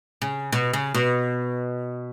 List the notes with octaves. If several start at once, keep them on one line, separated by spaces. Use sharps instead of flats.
C#3
B2
C#3
B2